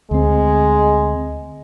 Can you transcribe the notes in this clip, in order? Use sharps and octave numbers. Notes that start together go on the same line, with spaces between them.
D2 G#3 C4